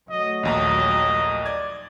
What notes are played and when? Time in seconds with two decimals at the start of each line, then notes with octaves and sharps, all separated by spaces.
0.10 F#3 A3 D#5
0.43 A#1 D#2 D#5 A#5
1.46 D5 G#6